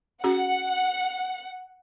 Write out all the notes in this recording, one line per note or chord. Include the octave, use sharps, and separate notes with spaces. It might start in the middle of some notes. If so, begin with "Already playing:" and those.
C#4 F#4 G#4 F#5